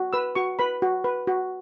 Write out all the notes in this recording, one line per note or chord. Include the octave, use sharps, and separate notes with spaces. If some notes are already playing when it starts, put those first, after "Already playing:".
Already playing: F#4
B4 E6
F#4 C#6
B4 B5
F#4
B4
F#4